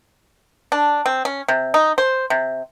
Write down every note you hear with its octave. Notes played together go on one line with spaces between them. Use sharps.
D4
C4
C#4
C3
D#4
C5
C3